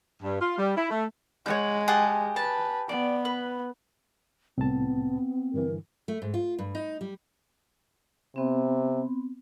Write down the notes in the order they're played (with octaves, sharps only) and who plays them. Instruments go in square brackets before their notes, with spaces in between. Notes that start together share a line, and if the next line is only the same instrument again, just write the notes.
[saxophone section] G2
F4
G3
E4
A3
[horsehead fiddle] G#3 [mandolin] C#5 F#5 G6
[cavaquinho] G4 G#4 F#5 [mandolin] A5
[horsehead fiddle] B4 [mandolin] A5
[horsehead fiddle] B3 [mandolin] D5
[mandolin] B4
[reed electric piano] C2 A2 A5 [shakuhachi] B3 [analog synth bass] C4
[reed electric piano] G2 D3 E3 [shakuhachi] A#4
[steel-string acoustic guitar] A3
G#2
F4
G2
D#4
G3
[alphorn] C3 [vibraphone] B3 C4